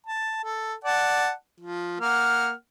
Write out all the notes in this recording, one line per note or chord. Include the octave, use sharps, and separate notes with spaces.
A5
A4
D5 F#5 A5
F3
A#3 F#5 F6